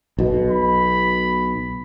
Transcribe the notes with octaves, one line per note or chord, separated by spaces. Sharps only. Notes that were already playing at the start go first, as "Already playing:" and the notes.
B1 B2
B5